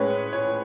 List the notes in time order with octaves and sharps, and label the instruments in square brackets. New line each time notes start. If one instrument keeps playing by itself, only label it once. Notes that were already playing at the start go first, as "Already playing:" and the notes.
Already playing: [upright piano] A2 G#3 C#4 B4 C#5
C#5